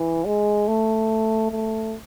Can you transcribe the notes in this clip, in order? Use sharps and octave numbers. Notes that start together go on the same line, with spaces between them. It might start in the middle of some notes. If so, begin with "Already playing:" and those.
Already playing: E3
G#3
A3
A3